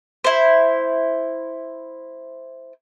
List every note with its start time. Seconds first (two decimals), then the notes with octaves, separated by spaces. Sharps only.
0.24 E4 C5